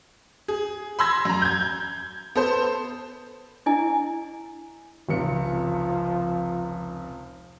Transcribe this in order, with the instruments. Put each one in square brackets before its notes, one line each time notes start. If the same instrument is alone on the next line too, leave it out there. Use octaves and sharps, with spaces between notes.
[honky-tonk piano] G#4
B5 C6 E6 G#6 A#6
F#2 A#5
G6 G#6
B3 A4 C5
[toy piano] D4 E4 D#5 G#5
[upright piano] F1 C#2 C#7 [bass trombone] F3